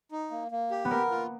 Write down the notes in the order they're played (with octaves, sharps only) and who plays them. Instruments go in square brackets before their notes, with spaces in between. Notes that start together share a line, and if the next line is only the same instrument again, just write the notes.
[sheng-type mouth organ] D#4
A#3
A#3
G4
[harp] B3
[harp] A#3 [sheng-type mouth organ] A#4
[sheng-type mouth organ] F4